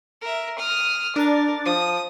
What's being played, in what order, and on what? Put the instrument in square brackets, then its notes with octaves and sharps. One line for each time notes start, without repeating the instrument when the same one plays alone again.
[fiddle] A#4 E5
D#6 F6
[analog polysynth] D4 A6 [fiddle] A#4
[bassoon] F3 [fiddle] D#6